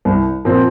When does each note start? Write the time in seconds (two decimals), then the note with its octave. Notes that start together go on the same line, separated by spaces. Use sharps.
0.05 C2
0.45 A#2 F3 C4